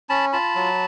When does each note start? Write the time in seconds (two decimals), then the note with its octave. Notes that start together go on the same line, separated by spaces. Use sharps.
0.09 C#4 A5 B5
0.33 F4 A5 B5
0.55 F#3